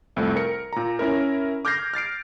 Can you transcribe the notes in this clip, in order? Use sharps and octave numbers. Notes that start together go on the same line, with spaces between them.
C2 F2 A3
A#4 C#7
A#2 A#5
C#4 E4 A#4
D6 F6 G6 G#6 A#6 C7
F6 A6 C7 D7